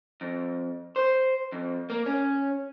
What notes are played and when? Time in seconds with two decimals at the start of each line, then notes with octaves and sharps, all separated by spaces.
0.21 F2
0.96 C5
1.52 F2
1.90 A#3
2.06 C#4